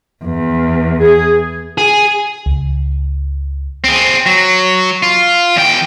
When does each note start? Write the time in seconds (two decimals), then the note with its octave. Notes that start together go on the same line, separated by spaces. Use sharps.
0.24 E2
1.00 G#4
1.78 G#4
2.46 C#2
3.84 C4 G#4
4.26 F#3
5.03 F4
5.56 E2 G5